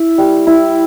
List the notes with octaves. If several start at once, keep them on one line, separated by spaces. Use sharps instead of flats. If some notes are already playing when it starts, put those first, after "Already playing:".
Already playing: E4
G3
E4